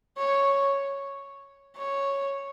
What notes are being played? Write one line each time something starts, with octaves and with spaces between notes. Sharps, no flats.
C#5
C#5